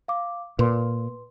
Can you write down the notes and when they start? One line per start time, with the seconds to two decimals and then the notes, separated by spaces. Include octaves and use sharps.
0.08 F5 D6
0.59 A#2 B4 C6